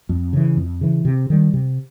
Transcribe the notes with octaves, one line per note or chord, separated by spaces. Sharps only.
F2
C#3 E3
F2
C#3 E3
C3
D#3 G3
C3